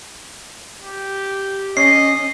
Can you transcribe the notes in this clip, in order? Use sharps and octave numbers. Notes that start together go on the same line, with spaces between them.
G4
C#4 D#5 C7